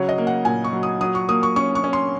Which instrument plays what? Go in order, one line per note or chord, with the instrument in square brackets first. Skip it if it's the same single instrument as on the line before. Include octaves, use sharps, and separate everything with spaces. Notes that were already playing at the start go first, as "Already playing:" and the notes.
Already playing: [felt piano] C#3 F#3 C#5
D#5
A#3
F#5
A#2 G#5
C#6
F#3
D#6
F#3 D#6
C#6
A#3 D#6
C#6
C#4 C#6
C#6
C#4
C6